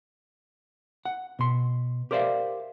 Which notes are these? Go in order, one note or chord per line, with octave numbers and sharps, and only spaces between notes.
F#5
B2 C6
G4 A#4 C5 D5 E5 F5